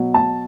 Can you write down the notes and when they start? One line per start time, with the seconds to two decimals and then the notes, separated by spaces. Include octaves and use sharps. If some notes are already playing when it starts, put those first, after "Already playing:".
Already playing: B2 F#3
0.14 A5